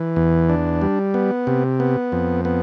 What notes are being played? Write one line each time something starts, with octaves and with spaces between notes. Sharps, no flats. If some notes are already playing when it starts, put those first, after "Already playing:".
Already playing: E3
E2
D4
G3
B3
C3
B3
F2
B3